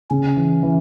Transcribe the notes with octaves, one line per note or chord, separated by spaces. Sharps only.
C#3 C#4
E3
E3